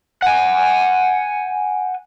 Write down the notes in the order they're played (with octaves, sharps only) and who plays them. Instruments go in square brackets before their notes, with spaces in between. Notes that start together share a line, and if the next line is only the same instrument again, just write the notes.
[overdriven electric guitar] F#5 G#5